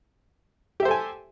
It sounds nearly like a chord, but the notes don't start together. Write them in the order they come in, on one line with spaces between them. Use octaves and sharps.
G4 E5 C5 A4 G#5